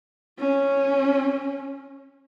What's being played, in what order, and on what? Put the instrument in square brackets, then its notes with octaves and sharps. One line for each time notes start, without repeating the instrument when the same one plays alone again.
[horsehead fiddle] C#4